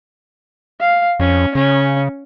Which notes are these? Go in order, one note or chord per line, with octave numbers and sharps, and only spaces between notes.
F5
F2 C#4
C#3 C#4